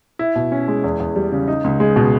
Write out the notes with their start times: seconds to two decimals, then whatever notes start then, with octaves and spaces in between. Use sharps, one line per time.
0.19 E4
0.35 B2
0.52 C#4
0.68 G#3
0.84 E2
1.00 E2
1.16 G3
1.32 C#3
1.48 D#4
1.64 C#2
1.80 G#3
1.96 B2